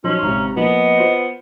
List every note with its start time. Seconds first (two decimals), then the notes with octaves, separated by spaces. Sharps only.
0.04 F3 F#3 C#4 D#4 C6
0.23 G#1 C3 A#5
0.56 F3 A#3 B3 D#5
0.98 F4 C5